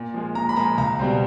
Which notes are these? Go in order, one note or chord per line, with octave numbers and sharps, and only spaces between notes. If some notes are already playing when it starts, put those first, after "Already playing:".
Already playing: A#2
F3 G#3
A#2 A#5
B5
F3 G#3 A#5
C#2 A#5
B2 G3 C4